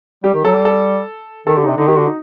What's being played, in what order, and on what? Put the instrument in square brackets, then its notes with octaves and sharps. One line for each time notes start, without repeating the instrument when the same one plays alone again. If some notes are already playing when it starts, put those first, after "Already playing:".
[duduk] G3 [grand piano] G4
[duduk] D#3
[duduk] F#3 [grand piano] A4
[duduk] G3
[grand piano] A4
[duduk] D#3 [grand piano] A4
[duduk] D3 [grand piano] G4
[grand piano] D#4
[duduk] C3 [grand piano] D4
[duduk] D3 [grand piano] D#4
[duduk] D#3 [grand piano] G4
[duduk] D3 [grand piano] F#4
[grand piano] D#4